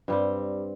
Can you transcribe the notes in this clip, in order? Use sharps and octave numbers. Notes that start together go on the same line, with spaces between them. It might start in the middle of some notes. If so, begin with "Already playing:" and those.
G2 G3 C4